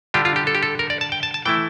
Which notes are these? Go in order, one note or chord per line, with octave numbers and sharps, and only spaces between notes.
D3 G3 D4 F4 G4
F4
G4
A4
G4
A4
A#4
D5
A5
G5
A5
A5
E3 A3 E4 G5